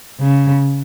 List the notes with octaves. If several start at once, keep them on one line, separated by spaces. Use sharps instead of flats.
C#3